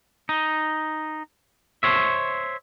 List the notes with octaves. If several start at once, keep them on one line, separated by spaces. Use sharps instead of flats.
D#4
C5 C#5 E5